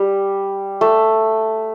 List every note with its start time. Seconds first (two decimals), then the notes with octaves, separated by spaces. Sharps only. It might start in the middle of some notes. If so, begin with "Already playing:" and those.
Already playing: G3
0.81 A3